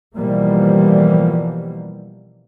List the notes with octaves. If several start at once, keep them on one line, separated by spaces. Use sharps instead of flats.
B2 E3 F3 G3 A#3